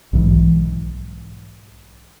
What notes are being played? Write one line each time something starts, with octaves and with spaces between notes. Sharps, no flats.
B1 G#2 E3